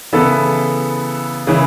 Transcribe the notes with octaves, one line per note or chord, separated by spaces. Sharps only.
C#3 E3 B3 E4 A4
C#3 E3 C#4 E4